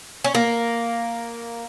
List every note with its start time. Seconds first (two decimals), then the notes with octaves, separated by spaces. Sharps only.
0.24 C#4
0.35 A#3